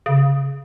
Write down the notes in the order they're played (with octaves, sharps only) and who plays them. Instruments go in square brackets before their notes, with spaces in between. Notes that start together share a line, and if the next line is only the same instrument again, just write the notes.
[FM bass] C#3